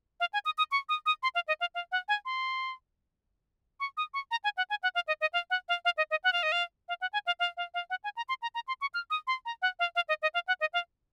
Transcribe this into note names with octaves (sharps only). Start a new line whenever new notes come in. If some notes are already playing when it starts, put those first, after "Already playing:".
F5
G#5
D#6
D#6
C#6
D#6
D#6
C6
F5
D#5
F5
F5
F#5
G#5
C6
C#6
D#6
C#6
A#5
G#5
F#5
G#5
F#5
F5
D#5
D#5
F5
F#5
F5
F5
D#5
D#5
F#5
F5
D#5
F5
F5
F#5
G#5
F5
F5
F5
F5
F#5
G#5
A#5
C6
A#5
A#5
C6
C#6
F6
D#6
C6
A#5
F#5
F5
F5
D#5
D#5
F5
F#5
D#5
F5